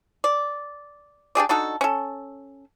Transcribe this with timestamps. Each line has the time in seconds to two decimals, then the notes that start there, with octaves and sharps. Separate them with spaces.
0.24 D5
1.35 D4 G4 G#4 D5
1.49 D4 D#4 F#4 A4
1.81 C#4 A4